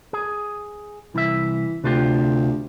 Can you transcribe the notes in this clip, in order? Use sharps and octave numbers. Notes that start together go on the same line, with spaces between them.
G#4
C2 E3 E5
D2 C3 F4 G4